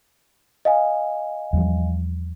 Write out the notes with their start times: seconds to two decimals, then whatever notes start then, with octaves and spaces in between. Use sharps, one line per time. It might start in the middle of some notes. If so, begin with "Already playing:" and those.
0.65 D#5 F5 G#5
1.53 E2 F3 G3